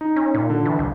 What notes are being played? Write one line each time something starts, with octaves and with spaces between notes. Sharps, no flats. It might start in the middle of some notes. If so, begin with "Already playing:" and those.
D#4
C#4
A#2
D3
E3
C2